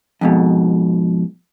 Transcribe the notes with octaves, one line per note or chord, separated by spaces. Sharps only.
F2 G#2 B2